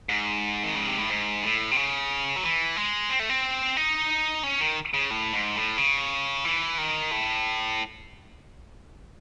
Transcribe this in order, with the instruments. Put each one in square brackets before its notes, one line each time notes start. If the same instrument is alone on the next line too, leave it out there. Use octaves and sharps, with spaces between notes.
[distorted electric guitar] G#2
D#3
C#3
C3
A2
G#2
A2
C3
C#3
F#3
E3
G#3
C4
A3
C4
D#4
C#4
D#3
C#3
A2
G#2
A2
C#3
E3
D#3
A2